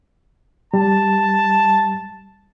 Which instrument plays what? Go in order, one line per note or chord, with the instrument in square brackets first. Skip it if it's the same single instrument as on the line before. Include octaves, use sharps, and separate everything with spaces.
[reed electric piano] G3 [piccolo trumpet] A5